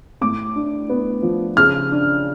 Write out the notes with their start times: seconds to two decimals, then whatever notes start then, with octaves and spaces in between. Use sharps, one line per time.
0.21 A2 D6
0.56 D4
0.90 B3
1.23 F3
1.57 C#3 F6
1.92 D4